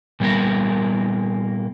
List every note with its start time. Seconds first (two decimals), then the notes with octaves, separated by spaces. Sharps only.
0.20 A#2 G3 A#3 B3 A#4